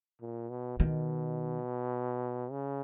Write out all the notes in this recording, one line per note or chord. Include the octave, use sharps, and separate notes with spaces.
A#2
B2
B2 D#3
C#3